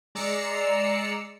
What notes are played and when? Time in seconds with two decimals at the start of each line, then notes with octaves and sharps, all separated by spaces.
0.15 G#3 D5 A#5 E6 C7 C#7